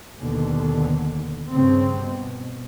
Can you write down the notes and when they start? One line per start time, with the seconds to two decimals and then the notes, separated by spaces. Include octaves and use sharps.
0.19 D#2 B2 D3
1.52 G2 C#3 C4
1.99 B2